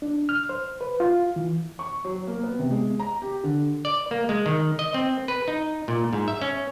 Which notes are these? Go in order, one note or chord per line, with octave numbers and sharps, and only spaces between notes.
D4
F6
C5
B4
F4
E3
C#6
F#3
A#3
B3
C3
G#3
A#5
G4
D3
D5
A#3
G#3
D#3
D#5
C4
B4
D#4
A#2
G#2
E5
C#4